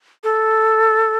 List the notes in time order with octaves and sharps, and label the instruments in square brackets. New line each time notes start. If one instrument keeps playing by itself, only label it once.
[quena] A4